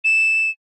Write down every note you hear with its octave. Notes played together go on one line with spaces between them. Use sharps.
E7